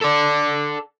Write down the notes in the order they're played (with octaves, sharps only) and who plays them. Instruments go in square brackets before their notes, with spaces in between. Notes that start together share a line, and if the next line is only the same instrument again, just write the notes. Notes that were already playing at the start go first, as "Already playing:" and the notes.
[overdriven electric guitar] A4 D5